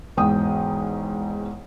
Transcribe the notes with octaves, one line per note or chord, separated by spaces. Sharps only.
E1 E2 G#2 G5 D#6